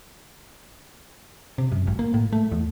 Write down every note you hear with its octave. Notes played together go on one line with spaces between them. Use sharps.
C3
F#2
G#1
A#3
A2
A3
E2